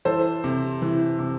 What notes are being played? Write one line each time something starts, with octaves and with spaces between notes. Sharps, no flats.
E3 A4 C5
C3
E3
C3